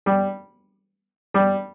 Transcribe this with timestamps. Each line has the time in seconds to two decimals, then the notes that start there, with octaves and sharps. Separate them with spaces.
0.06 G3
1.34 G3